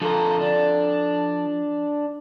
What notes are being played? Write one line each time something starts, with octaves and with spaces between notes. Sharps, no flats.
D3 F3 A4 A#4
D4